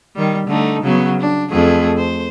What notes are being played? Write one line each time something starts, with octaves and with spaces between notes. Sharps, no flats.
D#3 G3
D3 A3 D#4
C#3 F#3 B3
D4
F2 A3 G#4
C5